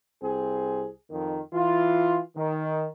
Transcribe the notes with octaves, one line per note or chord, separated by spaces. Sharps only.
C2 C4 G#4
F2 D#3
E3 F4
D#3